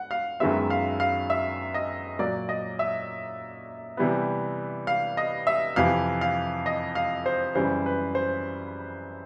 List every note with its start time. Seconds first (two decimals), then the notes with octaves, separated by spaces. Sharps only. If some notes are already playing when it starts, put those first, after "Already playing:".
Already playing: F#5
0.11 F5
0.40 F#2 D#3 G#3 B3 E5
0.70 F5
1.00 F5
1.30 E5
1.74 D#5
2.19 A#2 F#3 A#3 D5
2.49 D#5
2.79 E5
3.97 C3 E3 G3 B3
4.87 F5
5.17 D#5
5.47 E5
5.76 F2 C3 E3 F5
6.21 F5
6.66 D#5
6.95 F5
7.26 C5
7.55 F#2 C#3 E3 G3 C5
7.86 B4
8.15 C5